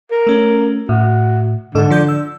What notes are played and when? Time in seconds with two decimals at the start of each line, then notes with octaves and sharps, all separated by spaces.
0.11 A#4
0.27 A3 C#4
0.89 A2 F#4
1.75 G#2 D3 A4
1.90 F3 D5 G6
2.09 E6